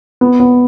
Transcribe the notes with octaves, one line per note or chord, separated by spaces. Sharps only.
B3
B3